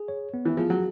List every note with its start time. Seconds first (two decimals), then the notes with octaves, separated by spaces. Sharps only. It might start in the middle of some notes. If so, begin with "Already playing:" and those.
Already playing: G#4
0.08 C#5
0.34 B3
0.45 E3
0.57 F3 G#4
0.70 F#3